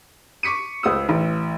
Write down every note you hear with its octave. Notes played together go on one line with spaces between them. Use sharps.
C#6 D6 B6 C#7 D#7
C#2 C5 D#6 E6
A1